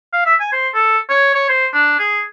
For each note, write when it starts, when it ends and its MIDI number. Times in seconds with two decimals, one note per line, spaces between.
0.13 0.25 77
0.26 0.35 76
0.40 0.49 80
0.52 0.69 72
0.74 0.98 69
1.09 1.34 73
1.35 1.47 73
1.49 1.67 72
1.73 1.96 62
1.99 2.22 68